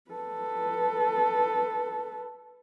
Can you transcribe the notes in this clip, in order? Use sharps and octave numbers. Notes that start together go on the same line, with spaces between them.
A4 B4